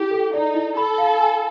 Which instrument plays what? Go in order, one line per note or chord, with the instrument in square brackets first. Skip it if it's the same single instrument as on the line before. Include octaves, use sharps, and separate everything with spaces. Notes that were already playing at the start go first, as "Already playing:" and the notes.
Already playing: [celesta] E4 G#4 [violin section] G4
[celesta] A4
[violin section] D#4 [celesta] D5
[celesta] E4
[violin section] A4 [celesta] B5
[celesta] F5
G#5